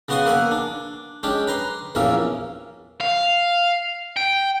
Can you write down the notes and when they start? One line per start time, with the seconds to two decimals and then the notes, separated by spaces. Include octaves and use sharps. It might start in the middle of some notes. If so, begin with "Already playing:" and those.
0.08 C#3 B3 F#4 C6 C#6 D#6
0.26 A#3 E5 F#5 G#5
0.51 D4
1.23 G#3 C#4 D4 G4
1.47 B4 A#5 C6
1.95 A#1 E2 G2 A#3 C#4 E5
3.01 F5
4.17 G5